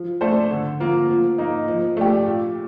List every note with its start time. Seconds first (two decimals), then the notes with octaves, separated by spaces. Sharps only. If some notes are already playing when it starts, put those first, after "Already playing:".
Already playing: F3
0.21 A3 D4 A4 C5
0.50 D3
0.80 F3 A#3 F4
1.09 F3
1.38 A#3 D#4
1.68 F3
1.97 A3 D4 G4
2.26 A#2